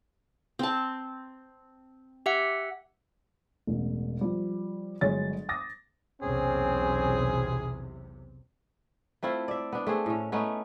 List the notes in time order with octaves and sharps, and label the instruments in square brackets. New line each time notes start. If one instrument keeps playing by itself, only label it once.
[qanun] C4 A5
[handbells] G4 E5 F#5
[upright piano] E1 A1
F3 G3
G1 F#3 G#3 C#5 A6
D6 D#6 A6 A#6
[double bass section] B1 E2 C3 [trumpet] C4 [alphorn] C#4 [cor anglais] G#4
[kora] A3 C4 E4 F4
D5 E5
B3 D4
A3 C4 G#4
A2 C#4
A3 B3 C#4 D#4